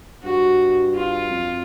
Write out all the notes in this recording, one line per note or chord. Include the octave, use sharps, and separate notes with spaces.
G2 F#4
F4
F2